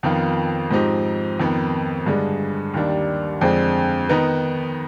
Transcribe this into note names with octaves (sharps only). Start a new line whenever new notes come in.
F2 D#3 B3 F4
G#2 F3 C4 D#4 G4
F2 D#3 B3
G2 D3 G#3
D#2 D#3 G3 D4
F2 D3 G#3 C4
D#3 B3 D#4 B4